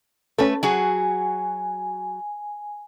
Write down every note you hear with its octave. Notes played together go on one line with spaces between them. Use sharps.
A3 C#4 A4 B4
F#3 F#4 G#4 G#5